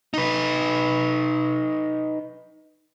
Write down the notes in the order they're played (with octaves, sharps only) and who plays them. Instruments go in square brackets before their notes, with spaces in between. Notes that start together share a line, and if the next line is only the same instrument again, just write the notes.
[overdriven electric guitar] D#4 B4